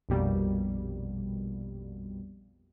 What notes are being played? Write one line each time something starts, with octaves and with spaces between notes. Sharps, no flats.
A#1 F2 B2 G3 A#3